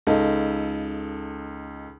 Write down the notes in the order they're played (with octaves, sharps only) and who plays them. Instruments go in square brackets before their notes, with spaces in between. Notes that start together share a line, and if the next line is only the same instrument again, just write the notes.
[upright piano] C#2 D#4 A4